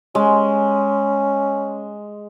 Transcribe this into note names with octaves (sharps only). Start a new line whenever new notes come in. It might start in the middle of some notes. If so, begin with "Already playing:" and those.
G#3 C#4